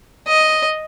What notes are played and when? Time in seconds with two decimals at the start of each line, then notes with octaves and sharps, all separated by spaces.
0.28 D#5